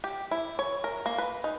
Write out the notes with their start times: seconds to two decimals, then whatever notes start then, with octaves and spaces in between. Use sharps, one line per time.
0.04 G4
0.31 E4
0.59 C#5
0.84 A#4
1.06 A#3
1.18 B4
1.44 D#4